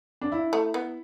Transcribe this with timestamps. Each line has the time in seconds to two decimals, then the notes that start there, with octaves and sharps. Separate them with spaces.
0.21 D4
0.32 E4
0.53 A3
0.74 B3